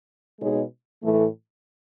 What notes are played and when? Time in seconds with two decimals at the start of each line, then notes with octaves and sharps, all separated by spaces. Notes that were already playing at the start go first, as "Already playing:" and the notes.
0.40 B2 G#3 D#4 G#4 C#5
1.03 A2 E3 A3